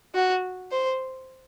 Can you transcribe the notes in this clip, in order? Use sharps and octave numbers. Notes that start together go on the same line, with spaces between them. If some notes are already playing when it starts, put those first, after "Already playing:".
F#4
C5